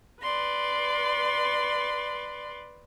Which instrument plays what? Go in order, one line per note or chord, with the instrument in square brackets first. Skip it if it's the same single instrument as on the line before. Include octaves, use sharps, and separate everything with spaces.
[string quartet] B4 D5 C6